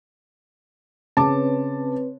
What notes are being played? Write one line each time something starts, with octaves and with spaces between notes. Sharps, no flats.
C#3 C4 B4 C#5 A5 D6